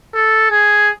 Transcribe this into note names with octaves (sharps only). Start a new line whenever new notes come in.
A4
G#4